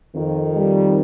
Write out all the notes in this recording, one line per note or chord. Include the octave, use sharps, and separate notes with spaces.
F2 D#3
G3